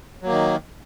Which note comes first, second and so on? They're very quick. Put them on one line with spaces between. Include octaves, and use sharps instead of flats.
F#3 A#3 D#3